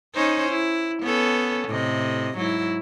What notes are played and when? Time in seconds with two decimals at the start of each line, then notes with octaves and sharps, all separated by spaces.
0.15 C#4 D#4 C5
0.49 E4
1.03 B3 C#4 A4
1.68 A2 C3 D#5
2.35 G#2 F#3 E4